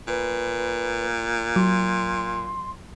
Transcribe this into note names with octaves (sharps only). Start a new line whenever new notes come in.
A#2 B4
F#3 C6